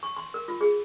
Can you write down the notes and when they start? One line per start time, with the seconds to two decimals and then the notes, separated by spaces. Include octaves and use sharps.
0.03 C#6
0.16 C6
0.34 A#4
0.48 F4
0.61 G#4